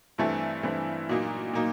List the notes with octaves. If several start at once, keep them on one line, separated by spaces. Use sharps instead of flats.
G2 E3 A3 C4 E4
G2 E3 A3 C4 E4
A#2 F#3 A#3 D#4
A#2 F#3 A#3 D#4